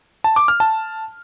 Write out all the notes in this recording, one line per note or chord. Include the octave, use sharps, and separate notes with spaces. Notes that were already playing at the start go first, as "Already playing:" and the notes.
A5
D6
F6
A5